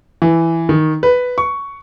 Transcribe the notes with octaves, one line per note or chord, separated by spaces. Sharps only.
E3
D#3
B4
C#6